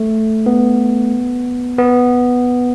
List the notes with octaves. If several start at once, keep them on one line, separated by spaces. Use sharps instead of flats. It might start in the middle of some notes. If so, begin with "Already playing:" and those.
Already playing: A3
B3
B3